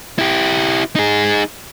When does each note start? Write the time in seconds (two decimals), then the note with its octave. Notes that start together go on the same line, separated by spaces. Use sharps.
0.19 E4 G4
0.96 D#4 G#4